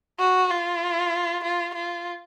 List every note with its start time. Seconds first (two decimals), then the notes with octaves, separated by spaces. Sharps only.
0.19 F#4
0.50 F4
1.43 F4
1.75 F4